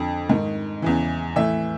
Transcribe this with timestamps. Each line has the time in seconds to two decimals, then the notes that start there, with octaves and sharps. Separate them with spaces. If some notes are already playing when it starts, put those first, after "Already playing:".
Already playing: F2 D3
0.29 G#2 D#3
0.82 E2 C#3 E3
1.36 A2 E3 E5